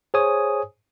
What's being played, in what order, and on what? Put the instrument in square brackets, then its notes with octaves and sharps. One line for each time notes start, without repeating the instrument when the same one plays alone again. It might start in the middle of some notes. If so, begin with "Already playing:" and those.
[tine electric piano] G#4 C5 C#5 G#5 D#6